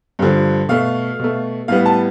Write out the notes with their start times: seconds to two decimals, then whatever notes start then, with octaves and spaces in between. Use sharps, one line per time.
0.19 G2 D3 F3
0.69 B2 A3 F5
1.19 B2 A3
1.68 A2 G3 B3 F5
1.86 A5